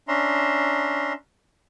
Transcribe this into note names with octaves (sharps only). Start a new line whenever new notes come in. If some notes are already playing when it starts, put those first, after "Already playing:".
C#4 D4 E5 A#5 C6